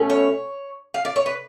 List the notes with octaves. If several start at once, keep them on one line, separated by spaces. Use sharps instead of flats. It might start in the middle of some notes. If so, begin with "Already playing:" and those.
Already playing: B2 A3 C#4
C#5
F5
D5
C#5
B4